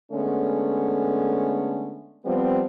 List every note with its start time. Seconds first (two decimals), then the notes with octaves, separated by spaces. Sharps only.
0.12 D3 G#3 A3 B3 C#4
2.25 F3 G3 B3 C4